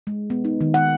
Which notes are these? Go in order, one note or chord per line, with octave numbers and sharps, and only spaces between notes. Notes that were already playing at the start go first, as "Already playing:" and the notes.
G#3
B3
D#4
D#3
F#5